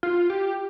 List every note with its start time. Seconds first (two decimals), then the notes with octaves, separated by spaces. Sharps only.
0.03 F4
0.30 G4